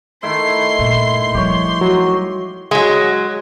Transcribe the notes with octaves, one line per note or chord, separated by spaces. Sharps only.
D#3 A3 E4 C6 C7
G2 A#2
F3 G3 G4 C#5 C6
F#3
F#3 G#3